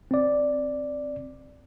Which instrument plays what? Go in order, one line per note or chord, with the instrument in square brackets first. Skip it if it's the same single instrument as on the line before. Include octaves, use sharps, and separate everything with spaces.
[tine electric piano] C4 D5